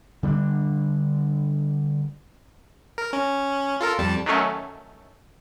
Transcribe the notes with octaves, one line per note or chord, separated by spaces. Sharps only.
D3 G3 C#4 D4
A#4
C#4
F4 A4 A#4
F2 G3 A5
D#3 F#3 A3 C#4